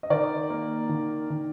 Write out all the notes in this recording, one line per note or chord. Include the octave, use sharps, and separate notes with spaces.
D#5
D#3 A#4 D5
A#3
D#3
D#3